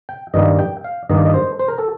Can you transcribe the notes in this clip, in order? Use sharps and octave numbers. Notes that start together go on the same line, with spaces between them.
G5
G2 D#3 G3 A#3 D#5
G5
F5
G2 D#3 A#3 D#5
D5
D#5
C5
C5
A#4
A4